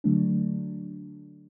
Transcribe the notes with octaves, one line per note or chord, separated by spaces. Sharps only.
D3 F#3 A3 D4